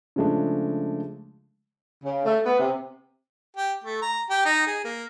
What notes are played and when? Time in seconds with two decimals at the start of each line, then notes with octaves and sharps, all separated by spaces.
0.16 C#3 F3 G#3 A3 D4
2.04 C#3
2.25 A3
2.45 B3
2.59 C3
3.57 G4
3.84 A3
4.02 A#5
4.30 G4
4.46 D#4
4.67 G#4
4.84 A#3